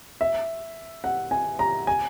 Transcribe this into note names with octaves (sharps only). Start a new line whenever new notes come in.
E5
F#5
G#5
A#5
G#5